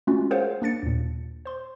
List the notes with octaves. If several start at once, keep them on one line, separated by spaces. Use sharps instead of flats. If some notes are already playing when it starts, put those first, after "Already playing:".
G#3 A3 C#4 D4 F4 F#4
G#4 A#4 C5 C#5 F5 F#5
A#3 D4 A6 C#7
D#2 A#2
C5 C6